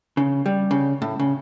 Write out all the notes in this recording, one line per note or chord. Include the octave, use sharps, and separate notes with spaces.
C#3
G3
C#3
A2
C#3